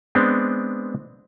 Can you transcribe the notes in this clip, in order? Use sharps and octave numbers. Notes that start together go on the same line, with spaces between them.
G#3 B3 C4 D4